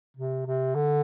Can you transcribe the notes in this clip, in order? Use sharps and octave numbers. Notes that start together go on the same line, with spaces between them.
C3
C3
D3